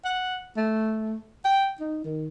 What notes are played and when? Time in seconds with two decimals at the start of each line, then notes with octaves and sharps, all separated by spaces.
0.04 F#5
0.56 A3
1.45 G5
1.80 D#4
2.05 D#3